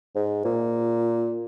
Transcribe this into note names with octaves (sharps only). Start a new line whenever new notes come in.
G#2
A#2